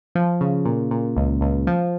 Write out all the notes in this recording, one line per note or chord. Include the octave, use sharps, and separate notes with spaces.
F3
C#3
A#2
A#2
C#2
C#2
F3